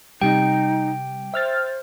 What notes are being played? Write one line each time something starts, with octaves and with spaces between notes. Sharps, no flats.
C3 G3 D#4 G5
C5 E5 F6 A6